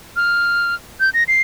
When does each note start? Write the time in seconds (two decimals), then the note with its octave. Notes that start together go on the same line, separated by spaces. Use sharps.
0.16 F6
1.00 G6
1.14 A#6
1.28 C7